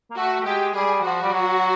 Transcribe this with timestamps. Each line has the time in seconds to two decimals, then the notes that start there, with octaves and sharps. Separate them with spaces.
0.11 A#3
0.17 A3 F#4
0.40 A3
0.45 G#3 G4
0.74 G3 G#4
1.03 F3 F#4
1.22 G3
1.32 F#3